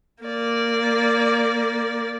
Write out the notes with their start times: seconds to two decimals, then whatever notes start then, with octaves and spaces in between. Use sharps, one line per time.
0.23 A#3 D5